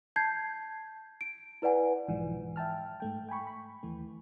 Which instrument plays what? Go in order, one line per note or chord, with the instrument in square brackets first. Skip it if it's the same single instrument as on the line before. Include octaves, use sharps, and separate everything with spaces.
[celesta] A5 G6 G#6 C7
D7
E4 B4 D5 F#5 G#5
[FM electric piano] B1 G#2 E3 F3
E5 G5 A5 F6
G#2 A3 G5
G5 G#5 B5 C#6
B5
D#2 E3 A3